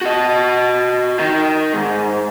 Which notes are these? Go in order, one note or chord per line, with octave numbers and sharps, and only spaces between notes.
F#4 D#5
D#3 D#4
G#2